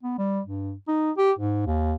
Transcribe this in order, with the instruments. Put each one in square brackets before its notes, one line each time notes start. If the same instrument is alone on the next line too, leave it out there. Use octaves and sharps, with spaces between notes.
[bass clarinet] B3
G3
G2
D#4
G4
G#2
D#2